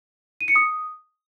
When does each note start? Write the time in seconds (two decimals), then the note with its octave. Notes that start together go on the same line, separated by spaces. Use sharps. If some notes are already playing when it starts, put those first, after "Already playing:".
0.41 D#7
0.48 C#7
0.56 D#6